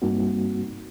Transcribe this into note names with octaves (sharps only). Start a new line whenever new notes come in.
G2 G3 A#3 C4 D#4 F#4